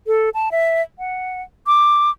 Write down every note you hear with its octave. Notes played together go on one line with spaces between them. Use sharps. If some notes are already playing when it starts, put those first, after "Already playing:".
A4
A5
E5
F#5
D6